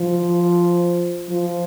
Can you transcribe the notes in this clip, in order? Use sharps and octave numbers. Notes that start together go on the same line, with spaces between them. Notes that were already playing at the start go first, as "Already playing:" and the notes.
Already playing: F3
F3